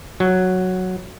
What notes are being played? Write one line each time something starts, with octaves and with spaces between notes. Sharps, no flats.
F#3